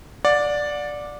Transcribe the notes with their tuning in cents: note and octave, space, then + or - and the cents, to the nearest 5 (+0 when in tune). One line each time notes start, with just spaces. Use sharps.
D5 +0 F#5 -35